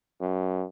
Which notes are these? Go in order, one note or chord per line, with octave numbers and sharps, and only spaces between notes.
F#2